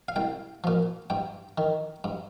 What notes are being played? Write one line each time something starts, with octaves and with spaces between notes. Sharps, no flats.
F5
C2 G5
A#2 F3
G2 G5
D#3
G2